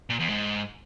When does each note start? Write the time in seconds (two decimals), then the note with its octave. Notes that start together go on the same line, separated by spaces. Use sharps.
0.10 A#2
0.20 E2
0.29 G#2